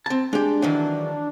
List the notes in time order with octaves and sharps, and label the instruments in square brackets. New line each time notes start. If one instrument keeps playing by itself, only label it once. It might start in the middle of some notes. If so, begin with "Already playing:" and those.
[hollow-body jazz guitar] C4 A5
[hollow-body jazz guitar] G#3 G4 [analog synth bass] D4
[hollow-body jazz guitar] D#3 E3 F#3